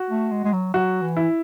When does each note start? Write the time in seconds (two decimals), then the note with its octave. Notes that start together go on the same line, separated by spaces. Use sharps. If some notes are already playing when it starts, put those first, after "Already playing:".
Already playing: F#4
0.10 A3
0.31 G#3
0.44 G#3
0.53 F#3
0.74 F#3 F#4
1.02 E3
1.17 E4